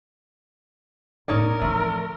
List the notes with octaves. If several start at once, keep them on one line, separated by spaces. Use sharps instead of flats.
E1 A2 D#4 A#4 C#5 D5
E3 F3 A3 C4